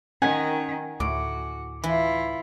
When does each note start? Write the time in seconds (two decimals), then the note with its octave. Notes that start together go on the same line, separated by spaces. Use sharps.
0.22 D#3 C#4 F#5 G#5
1.00 D2 A2 F#4 D6
1.84 E3 E4 F4